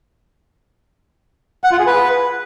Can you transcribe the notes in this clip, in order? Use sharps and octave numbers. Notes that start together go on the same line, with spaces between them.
F#5
F4
G#4
B4